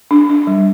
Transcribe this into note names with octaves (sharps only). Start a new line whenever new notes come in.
D4
D4
G3